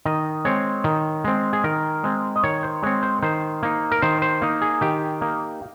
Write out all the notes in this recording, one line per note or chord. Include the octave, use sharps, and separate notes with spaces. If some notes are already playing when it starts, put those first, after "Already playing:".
D#3 D#5
G#3 C4 C#5
D#3
G#3 C4
G#4
D#3 A#4
G#3 C4
D#5
D#3 C#5
C5
G#3 C4 C#5
C5
D#3 C5
A#3 D#4
A#4
D#3 C5
C5
A#3 D#4
G#4
D#3 G4
A#3 D#4